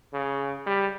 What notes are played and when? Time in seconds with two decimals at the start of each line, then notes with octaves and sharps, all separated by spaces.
0.13 C#3
0.66 G3